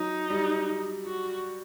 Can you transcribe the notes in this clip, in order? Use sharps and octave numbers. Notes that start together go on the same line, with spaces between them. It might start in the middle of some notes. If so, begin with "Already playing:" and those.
Already playing: F#3 D#4
G3
F#4